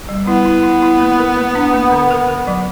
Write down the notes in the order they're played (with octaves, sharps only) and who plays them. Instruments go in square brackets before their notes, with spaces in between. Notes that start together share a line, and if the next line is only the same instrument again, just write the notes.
[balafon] G3
[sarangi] B3 [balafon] E4
[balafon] E4
E4
E4
A#3
A#4
A#3
D4
A#3
D3
A#4
A#4
F#3